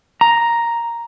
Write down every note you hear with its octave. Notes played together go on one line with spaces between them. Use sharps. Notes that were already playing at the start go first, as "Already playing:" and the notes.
A#5